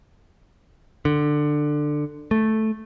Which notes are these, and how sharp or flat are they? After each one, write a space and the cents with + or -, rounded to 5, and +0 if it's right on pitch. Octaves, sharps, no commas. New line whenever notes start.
D3 +15
A3 -5